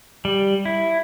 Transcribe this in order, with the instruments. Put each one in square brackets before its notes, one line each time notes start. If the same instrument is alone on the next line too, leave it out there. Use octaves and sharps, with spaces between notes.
[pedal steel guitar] G3
E4